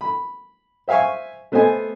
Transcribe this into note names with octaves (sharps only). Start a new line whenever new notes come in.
B5
C5 E5 F5 G#5 C#6
A3 B3 C5 D#5 G#5